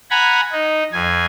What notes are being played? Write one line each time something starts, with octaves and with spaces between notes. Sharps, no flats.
F#5 G#5 A#5 B5
D#4
F2 G#5